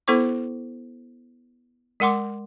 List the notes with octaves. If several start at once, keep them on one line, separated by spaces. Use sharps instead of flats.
B3 E4 A4 C5 C#6 D6
G#3 A#4 F#5 C6 D6